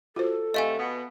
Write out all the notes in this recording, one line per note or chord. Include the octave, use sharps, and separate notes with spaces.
F4 F#4 A4 C5
C3 A3 D#5 F5 G#5
B2 B3